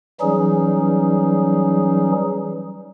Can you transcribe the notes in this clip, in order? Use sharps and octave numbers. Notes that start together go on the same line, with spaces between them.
E3 F#3 G3 C#4 D#4 G#4